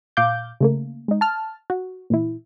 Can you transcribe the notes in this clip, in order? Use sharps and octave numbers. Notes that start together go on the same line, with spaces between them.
A#2 F5 D6 G6
C#3 A3 A#3
G#3 D#4
A5 F6
F#4
A#2 E3 E4